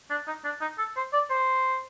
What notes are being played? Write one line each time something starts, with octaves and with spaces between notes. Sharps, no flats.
D4
D#4
D4
D#4
A4
C5
D5
C5